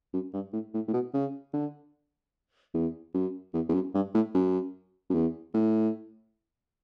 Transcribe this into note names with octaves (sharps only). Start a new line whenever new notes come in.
F#2
G2
A2
A2
A2
B2
C#3
D3
E2
F#2
E2
E2
F#2
G2
A2
F#2
F#2
E2
A2